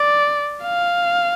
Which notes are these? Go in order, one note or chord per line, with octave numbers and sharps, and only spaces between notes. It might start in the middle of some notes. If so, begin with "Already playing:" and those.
Already playing: D5
F5